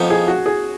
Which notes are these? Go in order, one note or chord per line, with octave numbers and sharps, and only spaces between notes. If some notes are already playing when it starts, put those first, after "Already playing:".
Already playing: F2 F3 B3 D#4
G#4
F#4
G#4